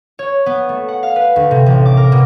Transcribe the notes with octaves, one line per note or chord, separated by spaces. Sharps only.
C#5
B3
A3
F#5
F5
B4
D2
C3
A1
D6
A#4
B2